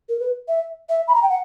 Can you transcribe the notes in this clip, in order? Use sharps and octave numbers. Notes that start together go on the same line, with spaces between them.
A#4
B4
E5
E5
B5
A#5
G5
F#5